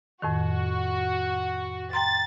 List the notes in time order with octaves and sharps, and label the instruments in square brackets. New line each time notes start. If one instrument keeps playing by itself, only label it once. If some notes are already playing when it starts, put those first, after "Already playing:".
[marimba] F2 A2 D#3 [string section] F#4
[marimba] G5 A#5 C6 [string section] A6